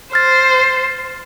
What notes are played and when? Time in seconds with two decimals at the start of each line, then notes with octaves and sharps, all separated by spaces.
0.13 C5 F6 A6